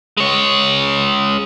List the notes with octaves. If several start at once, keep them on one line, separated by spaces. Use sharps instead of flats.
G#3 C#5